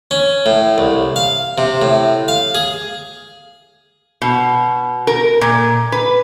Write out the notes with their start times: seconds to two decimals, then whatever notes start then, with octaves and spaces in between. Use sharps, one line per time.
0.11 C#4
0.46 A2
0.78 C2
1.16 F5
1.58 C3
1.82 A2
2.28 F5
2.55 G#4
4.22 B2
5.07 A#4
5.41 A#2
5.92 B4